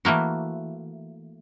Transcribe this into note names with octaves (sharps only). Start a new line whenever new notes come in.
E3 A3 A#3 F#4